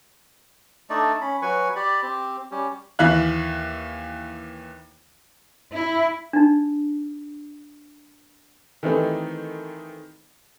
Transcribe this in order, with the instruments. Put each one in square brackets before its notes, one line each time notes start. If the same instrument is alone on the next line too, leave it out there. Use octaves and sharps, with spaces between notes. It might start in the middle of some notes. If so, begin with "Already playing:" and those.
[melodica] A3 D4 D#4 D5
C#4 B5
F#3 B4 G#5 C#6
G4 D5 B5
C4 G4
G3 C#4 G4
[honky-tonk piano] D#2 E3 E4 F5 F#6
[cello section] E4
[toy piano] D4 D#4
[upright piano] D#3 E3 A3 C4 D#4 G4